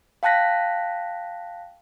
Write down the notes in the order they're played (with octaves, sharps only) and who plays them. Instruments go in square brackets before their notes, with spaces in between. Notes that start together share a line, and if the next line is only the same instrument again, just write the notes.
[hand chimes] F5 G5 A5 F#6 A#6 B6